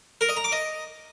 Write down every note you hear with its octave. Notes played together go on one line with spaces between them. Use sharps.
A#4
D#5
A#5
D6
D#5